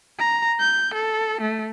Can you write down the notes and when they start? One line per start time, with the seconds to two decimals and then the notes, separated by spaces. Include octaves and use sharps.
0.19 A#5
0.60 G6
0.94 A4
1.41 A3